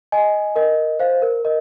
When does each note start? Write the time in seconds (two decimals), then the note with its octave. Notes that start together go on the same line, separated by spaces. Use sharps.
0.12 D#5 G#5
0.56 A#4 D#5
1.00 C5 F5
1.22 A#4
1.45 A#4 D#5